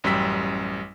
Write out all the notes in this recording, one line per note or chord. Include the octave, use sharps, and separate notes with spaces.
A1 F#2 G3 G5 E6 B6